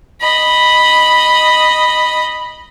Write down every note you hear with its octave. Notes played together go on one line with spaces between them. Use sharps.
D#5 B5